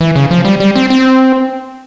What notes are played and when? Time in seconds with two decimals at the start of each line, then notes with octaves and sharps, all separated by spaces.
0.01 E3
0.15 C#3
0.31 F3
0.45 G3
0.60 G3
0.76 C4
0.90 C4